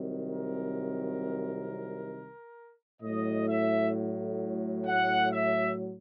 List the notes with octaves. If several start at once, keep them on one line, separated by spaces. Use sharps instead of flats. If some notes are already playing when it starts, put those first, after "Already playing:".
Already playing: C2 C3 D#3 F#3
A#4
A2 F#3 D#5
E5
F#5
E5